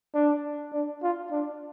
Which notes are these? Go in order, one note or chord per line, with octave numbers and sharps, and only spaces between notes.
D4
D4
F4
D4